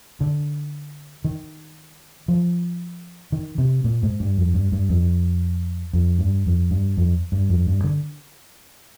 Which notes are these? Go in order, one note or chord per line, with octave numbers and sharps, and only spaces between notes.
D3
D#3
F3
D#3
C3
A#2
G#2
G2
F2
G2
G2
F2
F2
G2
F2
G2
F2
G2
F2
G2
D3